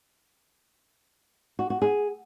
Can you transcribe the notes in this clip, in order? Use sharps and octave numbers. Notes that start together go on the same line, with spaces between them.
F#4
F#4
G#4